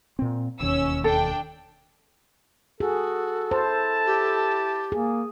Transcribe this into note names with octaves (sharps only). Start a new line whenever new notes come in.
A#2 C4
E1 D#2 C#4 E6
D4 A4 G5
F#4 G#4 A4
E4 C5 A5
G4
A#3 G#4